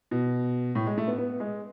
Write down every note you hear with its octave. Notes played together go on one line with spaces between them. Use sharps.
B2
A2
G#3
A3
B3
B3
G#3